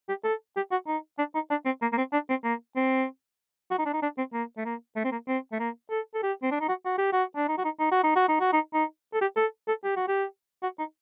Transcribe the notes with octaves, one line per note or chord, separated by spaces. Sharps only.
G4
A4
G4
F#4
D#4
D4
D#4
D4
C4
A#3
A#3
C4
D4
C4
A#3
C4
F#4
D#4
D4
D#4
D4
C4
A#3
A3
A#3
A3
C4
A#3
C4
A3
A#3
A4
A4
G4
C4
D4
D#4
F#4
F#4
G4
F#4
D4
D#4
F#4
D#4
D#4
F#4
D#4
F#4
D#4
F#4
D#4
D#4
A4
G4
A4
A4
G4
F#4
G4
F#4
D#4